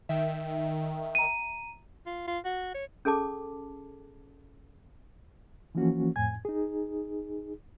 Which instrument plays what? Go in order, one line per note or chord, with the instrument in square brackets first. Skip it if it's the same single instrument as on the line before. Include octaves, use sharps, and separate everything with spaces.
[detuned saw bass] D#3 [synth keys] E5 G5
[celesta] A#5 D#7
[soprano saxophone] F4
F4
F#4
C#5
[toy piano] C#4 G#4 A4 A5 D6
[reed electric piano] E3 F3 A#3 C#4 F#4
F2 A2 G#5 G#6
D#4 G#4